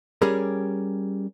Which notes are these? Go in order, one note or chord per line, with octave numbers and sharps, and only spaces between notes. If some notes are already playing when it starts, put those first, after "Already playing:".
G3 C#4 G4 G#4 A#4